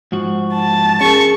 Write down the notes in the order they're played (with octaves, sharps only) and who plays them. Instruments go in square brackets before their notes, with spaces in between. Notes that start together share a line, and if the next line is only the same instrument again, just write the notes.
[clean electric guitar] G#2 F3 F#4
[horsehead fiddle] A5
[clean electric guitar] C#4 [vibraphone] G#4 A#4 [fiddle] C#6